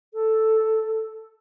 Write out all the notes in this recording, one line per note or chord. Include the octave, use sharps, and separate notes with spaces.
A4